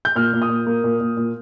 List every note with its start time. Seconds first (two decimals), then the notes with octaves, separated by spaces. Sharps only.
0.05 G6
0.16 A#2 F6
0.33 A#2
0.42 D#6
0.50 A#2
0.67 A#3
0.84 A#2
1.00 A#2
1.17 A#2